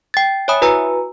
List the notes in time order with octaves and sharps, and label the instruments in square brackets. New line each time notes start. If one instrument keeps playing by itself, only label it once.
[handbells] G5 A6
C#5 E5 G#5 B5 D#6
E4 F#4 B4 G#5 A#5 E6